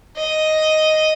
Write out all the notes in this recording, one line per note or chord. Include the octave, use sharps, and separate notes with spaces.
D#5